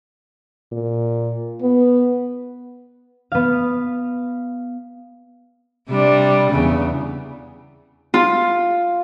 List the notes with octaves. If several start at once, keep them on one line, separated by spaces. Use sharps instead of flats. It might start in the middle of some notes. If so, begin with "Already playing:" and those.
A#2
B3
B3 F5
C3 G3 D4
E2 C#3
F4